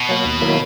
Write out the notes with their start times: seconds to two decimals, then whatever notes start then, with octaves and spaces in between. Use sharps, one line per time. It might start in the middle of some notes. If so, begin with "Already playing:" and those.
Already playing: B2
0.09 F#3 A#3
0.25 D#2
0.41 D#3 F#3 A#3 E4